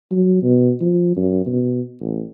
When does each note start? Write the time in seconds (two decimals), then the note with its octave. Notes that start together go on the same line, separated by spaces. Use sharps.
0.11 F#3
0.43 B2
0.80 F3
1.16 F#2
1.46 B2
2.00 A1